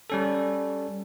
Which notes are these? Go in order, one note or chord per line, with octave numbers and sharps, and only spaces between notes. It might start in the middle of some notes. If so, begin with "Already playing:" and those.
G3 C#4 A4